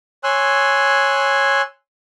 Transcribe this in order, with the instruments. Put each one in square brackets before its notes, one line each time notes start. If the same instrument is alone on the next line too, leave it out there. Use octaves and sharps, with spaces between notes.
[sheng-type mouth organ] C#5 G#5 C6 E6 F#6